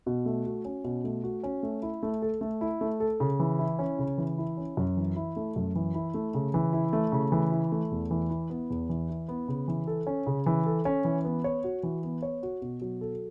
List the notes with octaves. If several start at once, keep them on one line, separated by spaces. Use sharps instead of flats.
B2
A3
F#4
C#4
B2
A3
F#4
C#4
A3
E4
A3
A4
A3
E4
A3
A4
C#3
E3
E4
C#4
C#3
E3
E4
C#4
F#2
E3
E4
A3
F#2
E3
E4
A3
C#3
E3
E4
A3
C#3
E3
E4
A3
E2
E3
E4
B3
E2
E3
E4
B3
C#3
E3
A4
C#4
C#3
E3
A4
C#4
E3
B3
C#5
F#4
E3
B3
C#5
F#4
B2
F#3
A4